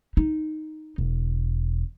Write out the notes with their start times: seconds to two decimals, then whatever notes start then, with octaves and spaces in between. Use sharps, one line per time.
0.17 D#4
0.98 E1